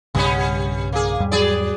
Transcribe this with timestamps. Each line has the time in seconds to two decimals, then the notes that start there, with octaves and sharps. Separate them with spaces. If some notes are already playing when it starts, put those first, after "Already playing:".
0.15 B1 G2 C#3 G3 B3 C#4
0.93 A#3 G#4
1.20 E2 G#2 G3
1.32 F#3 G#4 D5